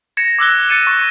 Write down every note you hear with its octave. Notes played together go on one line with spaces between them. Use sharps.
G#6 A#6 C#7 E7
D6 E6 F#6 G7
F#6 A6 C#7 D#7 E7
C#6